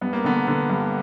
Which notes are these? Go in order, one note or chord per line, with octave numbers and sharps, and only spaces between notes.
G2 B3
A#3
D3 B3
D3
G2